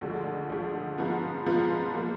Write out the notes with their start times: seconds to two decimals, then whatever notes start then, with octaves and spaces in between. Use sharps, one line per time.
0.01 D2 D3 F3 G#3
0.50 D2 D3 F3 G#3
0.98 G#2 F3 B3 F4
1.46 G#2 F3 B3 F4
1.95 F3 A#3 F4